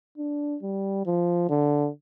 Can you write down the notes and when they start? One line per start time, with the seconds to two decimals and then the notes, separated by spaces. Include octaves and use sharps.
0.18 D4
0.62 G3
1.06 F3
1.49 D3